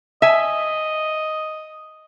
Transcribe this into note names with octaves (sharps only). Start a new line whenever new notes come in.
D#5 E5 G#5